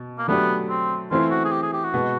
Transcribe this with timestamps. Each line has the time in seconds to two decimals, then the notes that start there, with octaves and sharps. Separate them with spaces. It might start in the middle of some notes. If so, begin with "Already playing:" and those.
Already playing: B2
0.19 A#3
0.28 F#3 A3 B3 D4 G4
0.70 C4
1.11 E3 A3 C4 E4 F4
1.31 F#4
1.45 G#4
1.52 G4
1.62 G#4
1.73 G4
1.84 F#4
1.94 B2 G#3 B3